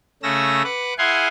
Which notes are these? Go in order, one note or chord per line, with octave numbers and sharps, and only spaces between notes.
C#3 A3 C#4 E6 A#6
B4 F#5 D6
E4 G#4 F5 F#5 G#5 C6